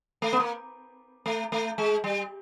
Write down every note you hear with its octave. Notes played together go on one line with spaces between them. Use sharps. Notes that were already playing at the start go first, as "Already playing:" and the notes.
A3
B3
A#3
A3
A3
G#3
G3